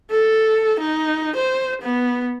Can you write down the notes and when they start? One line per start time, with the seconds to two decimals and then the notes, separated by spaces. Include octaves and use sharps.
0.12 A4
0.80 D#4
1.36 C5
1.82 B3